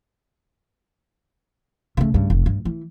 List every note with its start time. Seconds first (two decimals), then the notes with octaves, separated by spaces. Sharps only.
1.97 C#3 A3
2.14 G2 C#3
2.30 F1
2.46 G2
2.65 E3